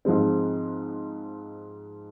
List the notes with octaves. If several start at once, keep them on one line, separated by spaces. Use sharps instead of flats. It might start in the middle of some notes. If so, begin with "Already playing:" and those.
G#2 F3 G#3 C4